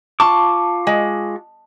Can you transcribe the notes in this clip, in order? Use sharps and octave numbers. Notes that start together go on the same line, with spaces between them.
F4 A5 C#6 D6
G#3